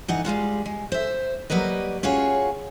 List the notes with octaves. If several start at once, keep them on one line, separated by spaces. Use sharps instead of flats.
D2 E3 D#4 D#5 F#5
G3 G#3 F4 F#4
G#3
C5 E5
F#3 G3 A#3 B4 D#5
C#4 F4 F#4 G#4 C#5